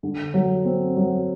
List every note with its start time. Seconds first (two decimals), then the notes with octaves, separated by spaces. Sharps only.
0.03 D3
0.34 F#3
0.65 C4
0.97 F#3